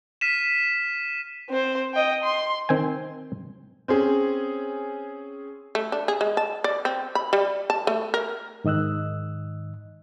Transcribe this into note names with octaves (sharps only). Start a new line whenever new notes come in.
F6 B6 D#7 E7
C4 C5
D#5 G5
C6
D#3 C4 G5 G#5
C4 C#4 G#4
A3
D4
G#4
G#3
A5
D5
C4
B5
G3
A5
A3
A#4
G#2 D#3 D#5 E6 F#6